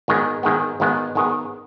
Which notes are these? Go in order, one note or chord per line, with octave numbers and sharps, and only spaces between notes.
G#1 G#2 D#3 G#3 B3
G#1 G#2 D#3 G#3 B3
G#1 G#2 D#3 G#3 B3
G#1 G#2 D#3 G#3 B3